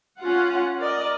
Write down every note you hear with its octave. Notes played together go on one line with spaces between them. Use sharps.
C#4 F4 F#5
A#4 D5 D#5